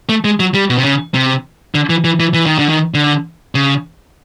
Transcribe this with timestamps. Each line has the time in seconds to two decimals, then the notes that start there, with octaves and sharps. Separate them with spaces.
0.09 A3
0.24 G#3
0.40 F#3
0.54 G3
0.70 B2
0.77 C3
0.84 C#3
1.14 C3
1.75 D3
1.90 E3
2.04 E3
2.20 E3
2.34 E3
2.46 D#3
2.59 D3
2.69 D#3
2.94 D3
3.55 C#3